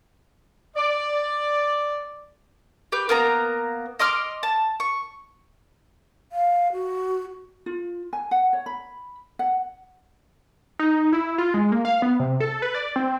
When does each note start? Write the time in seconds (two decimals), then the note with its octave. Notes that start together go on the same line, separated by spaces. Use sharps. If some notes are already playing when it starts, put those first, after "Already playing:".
0.77 D5
2.92 G4 B4 G6
3.09 A#3 B3 A#5
3.99 D#5 C6 D6 F6
4.43 A5
4.80 C#6
6.32 F5
6.73 F#4
7.66 F4
8.13 G#5
8.31 F#5
8.53 C#5
8.66 B5
9.39 F#5
10.79 D#4
11.13 E4
11.38 F4
11.54 G#3
11.72 A#3
11.85 F5
12.02 B3
12.20 C3
12.40 A4
12.62 B4
12.74 D5
12.96 C4